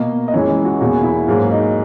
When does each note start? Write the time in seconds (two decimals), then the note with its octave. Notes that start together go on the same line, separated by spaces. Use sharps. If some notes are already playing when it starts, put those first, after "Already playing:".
Already playing: B2 A#3 D#5
0.28 D#5
0.33 F#2 E3 G#3 C#5
0.65 F#4
0.81 E2 B2 A#3 F#4
1.03 E4
1.28 G#2 F#3 A#3
1.51 D#4